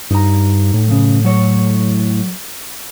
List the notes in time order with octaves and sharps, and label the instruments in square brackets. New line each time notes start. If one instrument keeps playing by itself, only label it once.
[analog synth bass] G2 [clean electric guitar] D#4 A#5
[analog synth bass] A2
[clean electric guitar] F#2 A#2 C#3
F#3 A4 C#5